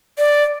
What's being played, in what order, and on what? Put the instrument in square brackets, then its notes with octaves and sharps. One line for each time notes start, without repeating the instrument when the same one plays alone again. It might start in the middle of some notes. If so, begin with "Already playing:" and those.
[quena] D5